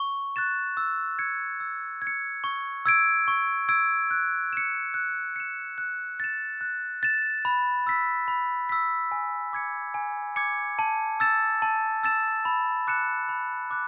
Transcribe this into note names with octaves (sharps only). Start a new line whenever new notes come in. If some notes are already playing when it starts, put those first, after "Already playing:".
Already playing: C#6
F#6 A6 E7
E6
G#6 C#7
E6
G#6
C#7
C#6
E6 G#6 D7
C#6
E6 G#6 D7
F#6
C#7 E7
F#6
C#7 E7
F#6
A6 E7
F#6
A6 E7
B5
E6 B6
B5
E6 B6
G#5
D6 G#6 C#7
G#5
D6 G#6 C#7
A5
E6 A6 E7
A5
E6 A6 E7
B5
D6 F#6 C#7 E7
B5
D6 F#6